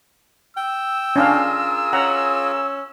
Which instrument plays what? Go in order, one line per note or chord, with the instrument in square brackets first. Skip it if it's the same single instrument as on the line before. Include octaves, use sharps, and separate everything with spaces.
[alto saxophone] G5 [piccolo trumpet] E6
[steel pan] C#4 D4 F5 [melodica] F4 G#4 A#4
[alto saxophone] C#4 [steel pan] F#5 A#5